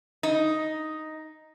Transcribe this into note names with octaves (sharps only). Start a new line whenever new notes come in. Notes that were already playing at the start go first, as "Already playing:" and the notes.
D#4